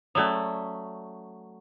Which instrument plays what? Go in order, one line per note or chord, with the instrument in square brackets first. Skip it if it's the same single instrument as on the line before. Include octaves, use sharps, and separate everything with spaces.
[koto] F#3 A3 [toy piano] C#4 D5 D#6